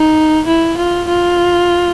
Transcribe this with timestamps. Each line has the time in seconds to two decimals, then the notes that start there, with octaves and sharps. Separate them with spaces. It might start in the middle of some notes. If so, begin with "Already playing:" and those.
Already playing: D#4
0.47 E4
0.77 F4
1.08 F4